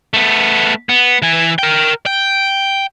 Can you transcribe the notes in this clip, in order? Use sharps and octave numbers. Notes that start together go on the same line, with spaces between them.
A3 B3
B3
E3 G#5
A#4 G5
G5